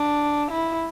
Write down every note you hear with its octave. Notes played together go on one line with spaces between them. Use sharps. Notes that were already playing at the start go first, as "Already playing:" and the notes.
Already playing: D4
E4